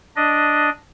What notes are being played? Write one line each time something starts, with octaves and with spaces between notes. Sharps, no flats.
D4 D#5